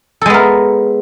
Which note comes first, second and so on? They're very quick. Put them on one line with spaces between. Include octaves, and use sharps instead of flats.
A4 G#3 B3 A#4